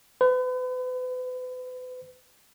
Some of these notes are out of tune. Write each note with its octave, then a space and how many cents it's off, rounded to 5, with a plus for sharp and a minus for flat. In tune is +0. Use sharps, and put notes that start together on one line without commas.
B4 +40